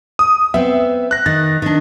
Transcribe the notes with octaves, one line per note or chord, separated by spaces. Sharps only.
D#6
B3 C4 E5
F#6 A#6
D#3 A6
D#3 D4